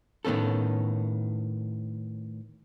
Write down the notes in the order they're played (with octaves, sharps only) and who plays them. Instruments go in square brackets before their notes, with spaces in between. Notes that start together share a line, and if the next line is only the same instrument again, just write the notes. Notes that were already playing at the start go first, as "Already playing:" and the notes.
[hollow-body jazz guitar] A2 D#3 B3 C#4 A4